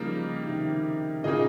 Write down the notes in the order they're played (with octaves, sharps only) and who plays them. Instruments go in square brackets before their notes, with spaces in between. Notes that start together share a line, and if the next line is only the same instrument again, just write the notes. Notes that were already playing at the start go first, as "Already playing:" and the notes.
Already playing: [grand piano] C#3 F3 [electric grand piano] G3 A#3 D#4
[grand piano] C3 D#3
[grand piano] A#2 C#3 [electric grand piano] A#3 D#4 G#4 D#5